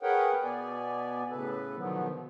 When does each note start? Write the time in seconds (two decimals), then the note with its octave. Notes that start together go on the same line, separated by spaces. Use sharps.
0.03 G#4 A#4 B4 C#5 F#5 G5
0.43 B2 B3 D5 G#5
1.30 A2 C#3 A4 B4
1.76 B2 D3 D#3 F3 F#3 B3